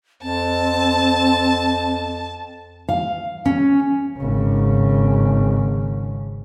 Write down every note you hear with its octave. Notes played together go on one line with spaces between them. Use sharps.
F2 C4 A5
F5
C#4
G#1 C#3